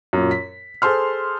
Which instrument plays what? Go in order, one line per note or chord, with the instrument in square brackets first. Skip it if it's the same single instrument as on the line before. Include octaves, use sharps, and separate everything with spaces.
[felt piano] F#2 A#2
B6
G#4 A4 C5 C6 F6